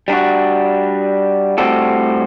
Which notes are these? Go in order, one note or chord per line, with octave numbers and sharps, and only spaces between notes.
G3 D4 F#4
A2 G3 C4 F#4 A4